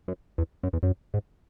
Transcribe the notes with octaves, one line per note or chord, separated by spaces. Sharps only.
F#2
E2
F#2
E2
F#2
G#2